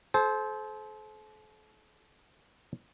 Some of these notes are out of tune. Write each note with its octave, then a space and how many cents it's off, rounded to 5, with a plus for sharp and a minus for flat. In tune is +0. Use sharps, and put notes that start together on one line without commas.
A4 -40 C5 +0